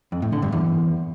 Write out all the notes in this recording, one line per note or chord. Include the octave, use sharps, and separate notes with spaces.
F2
A2
D3
G2
E2